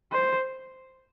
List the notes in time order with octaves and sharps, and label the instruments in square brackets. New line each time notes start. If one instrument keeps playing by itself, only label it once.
[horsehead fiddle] C5